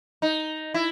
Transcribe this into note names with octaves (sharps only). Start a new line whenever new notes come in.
D#4
E4